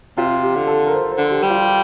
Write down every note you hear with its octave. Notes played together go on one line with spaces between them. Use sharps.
C3 F4
G4
D3
A4
A#4
C5
C5
D3
G4
G3
F4